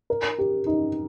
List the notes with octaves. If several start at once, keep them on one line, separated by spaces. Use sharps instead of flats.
A#4
G4
D#4